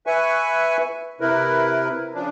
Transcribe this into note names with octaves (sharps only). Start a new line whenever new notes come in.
B4 E5 G#5 C#6
C3 E4 A#4 B4
C#3 F3 D4